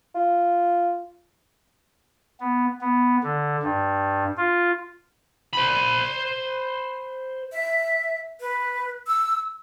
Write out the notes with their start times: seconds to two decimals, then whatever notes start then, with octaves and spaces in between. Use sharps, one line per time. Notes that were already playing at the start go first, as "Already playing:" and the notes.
0.15 F4
2.40 B3
2.81 B3
3.23 D3
3.63 G2
4.37 F4
5.53 C5 B5
7.52 E5
8.41 B4
9.07 E6